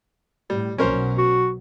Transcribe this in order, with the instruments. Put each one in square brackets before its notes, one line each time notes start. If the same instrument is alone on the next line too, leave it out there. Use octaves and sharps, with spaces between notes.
[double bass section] A2 [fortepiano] G3
[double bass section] B1 B2 F#3 [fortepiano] C#4 A#4 C5
[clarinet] F#4